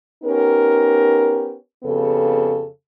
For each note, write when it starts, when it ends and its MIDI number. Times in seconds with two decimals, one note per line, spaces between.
0.23 1.55 59
0.23 1.55 61
0.23 1.55 63
0.23 1.55 67
0.23 1.55 70
1.84 2.65 41
1.84 2.65 49
1.84 2.65 59
1.84 2.65 67
1.84 2.65 69